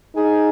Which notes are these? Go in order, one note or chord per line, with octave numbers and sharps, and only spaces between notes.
D#4 G#4